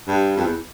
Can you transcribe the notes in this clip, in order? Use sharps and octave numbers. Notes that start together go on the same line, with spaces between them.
G2
F2
E2